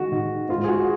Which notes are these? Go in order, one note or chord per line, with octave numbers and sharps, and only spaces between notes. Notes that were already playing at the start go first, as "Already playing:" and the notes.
Already playing: D#3 G#3 F#4
D#3
G#2 F4
G#4
F#4